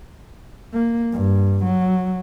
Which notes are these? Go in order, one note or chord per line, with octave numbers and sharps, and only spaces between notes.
A#3
G2
F#3